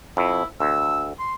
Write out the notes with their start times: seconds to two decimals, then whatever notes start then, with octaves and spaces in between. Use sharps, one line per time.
0.17 F2 E4
0.60 D2 E6
1.19 C6